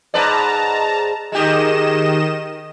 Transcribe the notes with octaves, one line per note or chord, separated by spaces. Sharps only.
G#2 B4 D5 A5 A#5
D#3 G#3 G4 D#5 E7